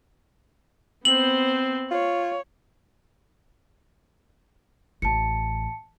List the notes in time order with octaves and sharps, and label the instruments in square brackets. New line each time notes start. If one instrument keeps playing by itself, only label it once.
[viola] B3 C5 [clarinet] C4 [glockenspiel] F#7
[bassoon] F4 [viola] C#5
[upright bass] A1 [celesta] A5 C#7